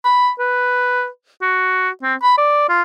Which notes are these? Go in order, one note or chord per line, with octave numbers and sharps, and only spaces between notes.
B5
B4
F#4
C4
B5
D5
F4